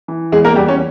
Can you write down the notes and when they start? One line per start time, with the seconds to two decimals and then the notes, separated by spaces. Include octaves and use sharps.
0.08 E3
0.32 E2 G#3 G#4
0.45 A#3 A#4
0.56 E2 G3 G4
0.68 C#4